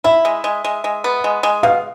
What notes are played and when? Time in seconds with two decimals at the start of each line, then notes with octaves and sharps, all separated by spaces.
0.04 E4 E5
0.25 G#3
0.44 G#3
0.64 G#3
0.84 G#3
1.04 B3
1.24 G#3
1.43 G#3
1.63 B2 F5